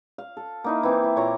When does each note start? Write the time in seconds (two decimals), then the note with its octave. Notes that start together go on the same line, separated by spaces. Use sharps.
0.18 F5
0.37 A4
0.64 A#3 D#4 E4
0.83 E3 C4
1.04 E4
1.16 A#2 C#5 A#5 D6